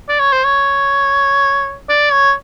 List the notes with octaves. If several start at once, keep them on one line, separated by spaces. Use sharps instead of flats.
D5
C#5
C5
C#5
D5
C#5